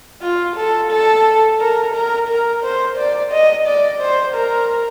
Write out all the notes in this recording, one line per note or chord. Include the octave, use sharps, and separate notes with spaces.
F4
A4
A4
A#4
A#4
A#4
C5
D5
D#5
D5
C5
A#4